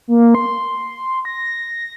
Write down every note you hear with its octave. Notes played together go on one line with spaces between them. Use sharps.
A#3
C6
A#6